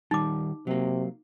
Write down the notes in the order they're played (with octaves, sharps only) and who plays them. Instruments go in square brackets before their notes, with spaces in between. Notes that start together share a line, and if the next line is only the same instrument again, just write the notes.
[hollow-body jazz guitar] D#3 G3 [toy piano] D#4 D6
[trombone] C3 [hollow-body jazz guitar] F#3 A#3